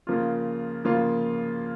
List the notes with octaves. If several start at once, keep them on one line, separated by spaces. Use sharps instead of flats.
C#3 F3 A#3 F4
C#3 F3 A#3 F4